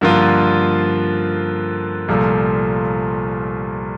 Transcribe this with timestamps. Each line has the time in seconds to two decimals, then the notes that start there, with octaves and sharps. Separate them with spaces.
0.01 G2 D3 F3 A#3 F4
2.08 C2 A#2 F3 A3